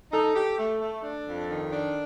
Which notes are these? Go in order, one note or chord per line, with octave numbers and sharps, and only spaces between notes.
D#4 A4
G4
A3
A3
D4
F2
D#3
D4